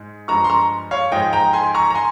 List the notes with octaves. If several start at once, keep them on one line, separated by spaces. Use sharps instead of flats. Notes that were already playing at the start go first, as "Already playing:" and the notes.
Already playing: G#2 G#3
G2 F3 G#3 A#5 C#6
C6
A#5 C#6
C#5 F5
G#2 F3 G#3 D#5 G5
G5 A#5
G#5 C6
A#5 C#6
A#5
G#5 C6